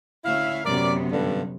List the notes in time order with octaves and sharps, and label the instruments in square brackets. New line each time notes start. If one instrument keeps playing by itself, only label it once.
[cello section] D2 C#4 E5 [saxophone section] E4 F5
[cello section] F#2 C3 B3 [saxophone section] A#4 D5
[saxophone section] G2 D3